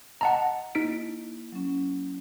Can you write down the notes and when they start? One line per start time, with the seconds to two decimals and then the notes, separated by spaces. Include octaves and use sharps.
0.21 D#5 F#5 A5 A#5
0.75 A#3 D#4 E4 B6 D7
1.52 F#3 C#4